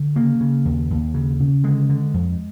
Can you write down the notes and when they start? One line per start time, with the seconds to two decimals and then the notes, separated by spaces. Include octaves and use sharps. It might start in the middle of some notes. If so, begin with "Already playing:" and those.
Already playing: D3
0.16 C#3 A#3
0.41 C#3
0.65 D#2
0.90 D#2
1.14 C#3
1.39 C#3
1.64 D3 G#3
1.89 D3
2.14 F2